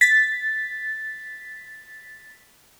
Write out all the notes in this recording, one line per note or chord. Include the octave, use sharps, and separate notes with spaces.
A6 B6